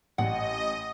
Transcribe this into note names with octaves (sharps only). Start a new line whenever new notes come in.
A1 D#5 F#5